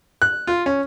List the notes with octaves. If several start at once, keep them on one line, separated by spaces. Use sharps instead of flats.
F#6
F4
C#4